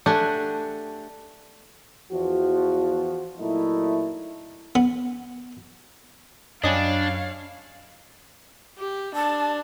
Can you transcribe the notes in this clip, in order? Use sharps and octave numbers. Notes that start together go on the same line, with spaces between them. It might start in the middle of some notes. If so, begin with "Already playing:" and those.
A3 D4 G4 F#5 G#5
E2 F3 F#4
A#2 F#3 A3 D#4 E4
B3
F#2 F#3 G3 C#4 D4 C#5 D#5 F5
G4
D4 A5